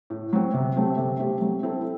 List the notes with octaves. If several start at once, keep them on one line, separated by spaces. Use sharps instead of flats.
A2
F#3 C4
C3
F#3 A3 C4 G4
C3
F#3 A3 C4 G4
F#3
C4 E4 A4